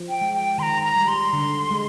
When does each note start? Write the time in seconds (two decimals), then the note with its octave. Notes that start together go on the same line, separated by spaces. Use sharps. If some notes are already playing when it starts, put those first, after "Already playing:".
Already playing: F3
0.09 G5
0.21 G#3
0.34 G5
0.58 D#3 C6
0.63 A#5
0.83 A#5
0.96 G3
1.08 C6
1.33 D3
1.71 G#3